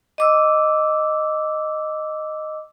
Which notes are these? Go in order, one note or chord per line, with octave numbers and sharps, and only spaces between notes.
D#5 D6 E6